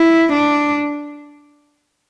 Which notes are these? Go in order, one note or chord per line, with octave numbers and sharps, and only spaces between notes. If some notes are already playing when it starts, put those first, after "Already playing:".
Already playing: E4
D4